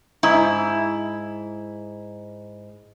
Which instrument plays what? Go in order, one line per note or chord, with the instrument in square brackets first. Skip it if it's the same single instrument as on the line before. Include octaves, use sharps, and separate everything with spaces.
[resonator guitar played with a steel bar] G#2 E4